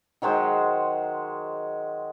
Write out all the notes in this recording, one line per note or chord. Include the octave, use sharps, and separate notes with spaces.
D#3 F#3 G#3 C5